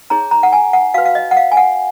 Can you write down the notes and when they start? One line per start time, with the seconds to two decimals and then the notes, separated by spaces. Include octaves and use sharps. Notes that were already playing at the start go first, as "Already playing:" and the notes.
0.10 D#4 G#4 C#5 A#5
0.31 A#5
0.43 F#5
0.53 G#5
0.73 F#5
0.94 F#4 B4 F5
1.05 F5
1.15 D#5
1.31 F#5
1.37 F5
1.52 G#5
1.57 F#5